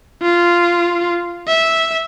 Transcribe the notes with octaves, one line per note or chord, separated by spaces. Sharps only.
F4
E5